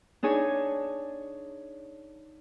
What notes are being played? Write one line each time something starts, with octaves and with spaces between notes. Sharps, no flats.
D4 D#4 G#4 C#5 G#5